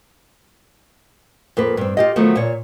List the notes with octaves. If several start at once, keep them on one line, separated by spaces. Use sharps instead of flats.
F2 A#3 B4
G2 C4
F4 G4 D#5
D#3 F3 F#3 A3 B3
A#2 C#5